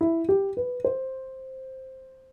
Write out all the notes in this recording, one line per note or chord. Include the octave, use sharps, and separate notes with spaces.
E4
G4
B4
C5